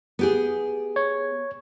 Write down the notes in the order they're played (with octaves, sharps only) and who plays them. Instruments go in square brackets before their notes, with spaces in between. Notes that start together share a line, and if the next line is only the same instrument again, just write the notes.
[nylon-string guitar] B3 G4 G#4
[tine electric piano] C#5